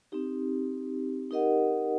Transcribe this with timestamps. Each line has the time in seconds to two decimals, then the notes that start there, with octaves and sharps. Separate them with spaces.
0.12 C4 D#4 G4
1.31 D#4 G4 A#4 D#5 F#5